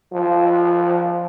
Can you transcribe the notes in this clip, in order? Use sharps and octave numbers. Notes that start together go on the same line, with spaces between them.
F3